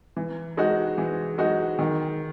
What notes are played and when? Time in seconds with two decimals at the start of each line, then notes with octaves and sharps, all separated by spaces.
0.16 E3
0.57 G#3 D#4 F#4
0.98 E3
1.38 G#3 D#4 F#4
1.79 D#3